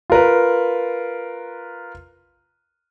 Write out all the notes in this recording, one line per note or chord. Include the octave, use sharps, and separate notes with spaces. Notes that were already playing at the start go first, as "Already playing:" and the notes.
F4 A#4 B4